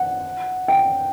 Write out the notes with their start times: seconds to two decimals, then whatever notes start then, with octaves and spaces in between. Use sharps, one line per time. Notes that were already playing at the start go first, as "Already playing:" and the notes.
Already playing: F#5
0.68 G5